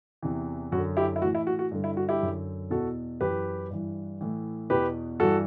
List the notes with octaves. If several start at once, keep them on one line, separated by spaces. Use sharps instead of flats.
E2 C3 E3
F#2 D3 F#4
E4 G4
E4
A2 E3 F#4
E4
F#4
F#4
G2 D3
E4
F#4
E4 G4
F#2 D3
E2 B2 F#4 A4
F#2 E3 G4 B4
G2 E3
A2 E3
E2 B2 G4 B4
G2 E3 F#4 A4